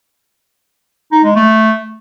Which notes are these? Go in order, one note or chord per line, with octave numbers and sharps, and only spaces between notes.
D#4
G#3
A3